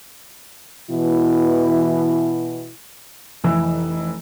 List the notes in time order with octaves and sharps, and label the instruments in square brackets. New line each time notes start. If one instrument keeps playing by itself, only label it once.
[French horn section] B2 E3 E4
[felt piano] F1 E3 E6